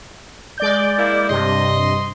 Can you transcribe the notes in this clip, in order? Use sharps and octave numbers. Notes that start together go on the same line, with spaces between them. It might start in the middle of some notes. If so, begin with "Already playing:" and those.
G#3 D5 G6
A#3 E4
G2 C3 D#5 C6